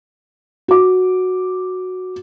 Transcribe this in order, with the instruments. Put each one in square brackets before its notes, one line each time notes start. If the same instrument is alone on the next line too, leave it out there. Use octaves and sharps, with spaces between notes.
[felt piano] F#4 D6